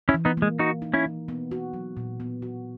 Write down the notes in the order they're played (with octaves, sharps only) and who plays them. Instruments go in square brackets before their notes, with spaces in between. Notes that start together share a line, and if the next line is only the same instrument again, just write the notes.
[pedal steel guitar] C#4 E4
[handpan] E3
[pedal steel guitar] B3 D#4
[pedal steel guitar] G#3 [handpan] A#3
[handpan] E3 [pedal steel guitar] D#4 F#4
[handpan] D#4
[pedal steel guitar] C#4 E4
[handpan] E3
B3
F#4
F#3
A#2
B3
F#4